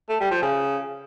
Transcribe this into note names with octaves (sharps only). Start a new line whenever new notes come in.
A3
G3
F3
C#3